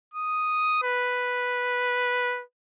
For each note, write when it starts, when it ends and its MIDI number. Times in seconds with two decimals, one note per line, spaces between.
0.14 0.78 87
0.83 2.43 71